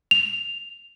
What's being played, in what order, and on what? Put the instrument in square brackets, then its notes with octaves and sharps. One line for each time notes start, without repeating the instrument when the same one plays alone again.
[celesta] F7